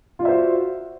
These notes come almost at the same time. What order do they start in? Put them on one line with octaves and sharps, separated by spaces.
F4 D5 E5 C5 F#4